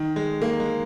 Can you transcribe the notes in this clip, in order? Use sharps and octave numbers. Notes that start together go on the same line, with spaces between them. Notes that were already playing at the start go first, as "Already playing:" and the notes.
Already playing: D#3
G#3
A#3
G#3